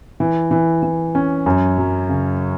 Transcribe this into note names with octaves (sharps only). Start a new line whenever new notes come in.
E3
E3
E3
C#4
F#2
F#3
C#3